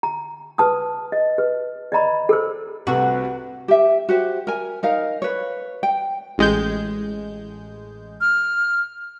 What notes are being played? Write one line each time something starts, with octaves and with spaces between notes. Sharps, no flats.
A#5
B4 A5 D#6
D#5
B4
D5 D#5 A#5 B5
A4 A#4 C5
C2 C3 A3 F#4 B4 F#5
G4 E5
F#4 G4 C5
A#4 G#5
D#4 A#4 F5
B4 C#5
G5
A1 G#3 G6
F6